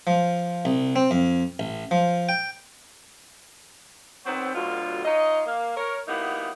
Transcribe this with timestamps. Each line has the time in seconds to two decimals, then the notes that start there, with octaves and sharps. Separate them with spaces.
0.07 F3
0.65 C2
0.96 C4
1.11 F2
1.59 A1
1.91 F3
2.29 G5
4.26 D#3 F#3 B3 C4
4.54 D2 B2 D3 F#3 F4
5.05 D#4 F4 C#5 D#5
5.46 A#3 F5
5.77 A#4 C#5
6.08 F#3 A#3 B3 D#4 E4 G4